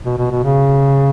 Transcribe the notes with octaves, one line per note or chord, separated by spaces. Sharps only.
B2
B2
B2
C#3